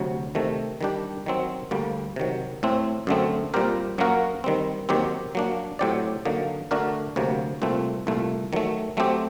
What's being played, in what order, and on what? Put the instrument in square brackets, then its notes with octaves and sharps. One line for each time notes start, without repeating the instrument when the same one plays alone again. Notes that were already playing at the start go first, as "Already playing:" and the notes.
Already playing: [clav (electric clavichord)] D2 C3 F#3
C3 D#3 A3
D#3 G3 D4 G4
D#3 F#3 C4
D2 D3 G3 A#3
C3 D#3 F#3
A2 A3 C4
F#2 D3 F#3 A3 C4
A#2 G3 C4 G4 A#4
F#2 F#3 A#3 F#4 A#4
D#3 G3 C4
D#2 D#3 F#3 C4 G4
F#3 A#3 D4
A2 F#3 C4 G4 D5
D3 F#3 A#3 D#4
D3 A3 D4 F#4 A#4
D2 C3 F#3 A#3
C2 A#2 A3 C4
C2 A#2 A3
D#3 F#3 A3
F#3 A3 C4 G4